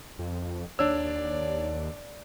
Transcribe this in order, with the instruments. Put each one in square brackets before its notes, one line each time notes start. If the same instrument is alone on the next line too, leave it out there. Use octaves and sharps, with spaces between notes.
[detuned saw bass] F2
[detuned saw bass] D#2 [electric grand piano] D4 E6 [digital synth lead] C#5 [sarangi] D5